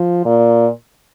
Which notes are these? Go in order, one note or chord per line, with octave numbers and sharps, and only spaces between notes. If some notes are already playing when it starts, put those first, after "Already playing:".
Already playing: F3
A#2